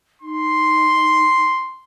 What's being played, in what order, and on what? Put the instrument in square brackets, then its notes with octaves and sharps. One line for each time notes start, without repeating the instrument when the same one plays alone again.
[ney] D#4 [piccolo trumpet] C6